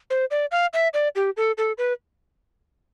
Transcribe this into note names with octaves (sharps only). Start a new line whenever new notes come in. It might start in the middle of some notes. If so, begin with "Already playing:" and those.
C5
D5
F5
E5
D5
G4
A4
A4
B4